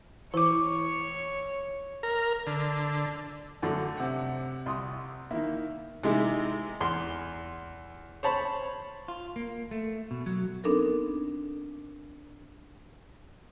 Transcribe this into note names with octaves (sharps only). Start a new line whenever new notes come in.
E3 E4 C#5 D6
A#4
D3
F#2 D3 A3
C3 F#5
C2 C6 D#6
D#3 A#3 E4
C3 D#3 G#3 D#4 E4
E2 C6
C5 C#5 A5 B5
F4
A#3
A3
B2
F#3
B3 C4 D4 D#4 A4 A#4